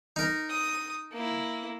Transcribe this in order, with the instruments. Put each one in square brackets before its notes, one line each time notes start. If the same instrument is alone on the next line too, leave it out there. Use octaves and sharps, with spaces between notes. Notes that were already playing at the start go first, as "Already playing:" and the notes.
[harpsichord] D#4 A#4
[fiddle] D#6
A#3 E4